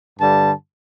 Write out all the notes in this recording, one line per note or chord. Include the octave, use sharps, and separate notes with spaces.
G2 D3 G3 A5